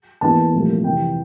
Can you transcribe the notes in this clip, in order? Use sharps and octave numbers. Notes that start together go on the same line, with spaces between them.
E2 E3 A#3 A5
C2 A#2 F3 A3
F2 C3 E3 G5